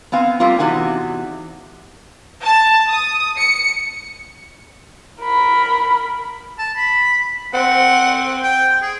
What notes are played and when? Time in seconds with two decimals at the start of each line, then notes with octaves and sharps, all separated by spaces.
0.12 B3 C4 F5 G#5
0.40 G3 A#3 C4 F4
0.59 E2 C3 D#4 F#4 G#5
2.45 A5
2.89 D#6
3.39 C#7
5.23 A#4 B5
6.59 A5
6.77 B5
7.54 C4 F#5
8.43 G5
8.82 G#4